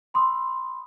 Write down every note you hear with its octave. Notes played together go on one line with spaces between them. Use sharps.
B5 C6 D#6 E6